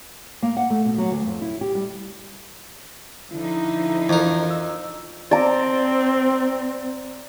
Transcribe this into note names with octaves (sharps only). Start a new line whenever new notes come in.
A#3
F#5
A3
B2
F#3
D2
F2
E4
G4
G3
D3 F3 D#4 E4
F2 E3 A#4
E6
C4 D5 A#5